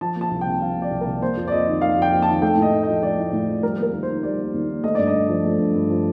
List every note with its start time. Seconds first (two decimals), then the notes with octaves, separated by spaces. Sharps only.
0.01 F3 A5
0.16 A#3
0.21 A5
0.31 C2
0.41 C3 G5
0.61 F3 F5
0.77 A#3
0.82 D5
0.91 C2
1.01 A#4
1.06 C3
1.22 A#3 C5
1.37 F2
1.48 D5
1.52 F2 D#5
1.67 D#3
1.81 A#3 F5
1.97 F2 G5
2.12 F2
2.22 D#3 A5
2.42 A3 G5
2.57 A2
2.62 D#5
2.73 A2
2.83 F3 D#5
3.02 A3 D5
3.18 A2
3.33 A2
3.48 F3
3.63 G3 A#4
3.79 A#3 A#4
3.93 D#2
4.03 C5
4.09 D#3
4.23 G3 D5
4.39 A#3
4.54 D#2
4.68 D#3
4.84 A3 D#5
4.95 G2 D5
5.07 D#5
5.14 G2
5.29 F3
5.45 A3
5.59 G2
5.75 G2
5.90 F3